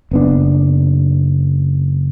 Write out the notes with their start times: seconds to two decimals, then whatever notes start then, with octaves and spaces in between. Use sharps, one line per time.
0.11 F#1 B3 D4